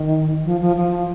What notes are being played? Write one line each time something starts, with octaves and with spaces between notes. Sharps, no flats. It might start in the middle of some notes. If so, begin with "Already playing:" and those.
Already playing: D#3
F3
F3
F3